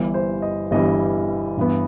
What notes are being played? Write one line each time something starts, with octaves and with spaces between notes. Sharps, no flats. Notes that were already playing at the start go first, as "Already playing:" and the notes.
Already playing: G1 G2 E3 G3 G4
C5
D#5
G1 G2 E3 G3 D#5
G2 E3 B3